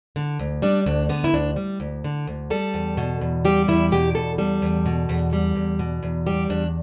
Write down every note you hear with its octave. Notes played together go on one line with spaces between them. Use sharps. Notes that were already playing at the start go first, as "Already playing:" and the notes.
D3
D2
G3 D4
D2 D4
D3 B3
E4
D2 D4
G3
D2
D3
D2
G3 A4
E2
B2
E2
G3 G4
E2 E4
B2 G4
E2 A4
G3 A4
E2
B2
E2
G3
E2
B2
E2
G3 G4
E2 D4